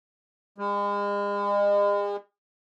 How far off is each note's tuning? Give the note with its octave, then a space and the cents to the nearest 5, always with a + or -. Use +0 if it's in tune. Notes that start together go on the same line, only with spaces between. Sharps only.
G#3 -40